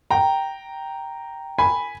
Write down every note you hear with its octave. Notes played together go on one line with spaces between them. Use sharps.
G5 A#5
G#5 B5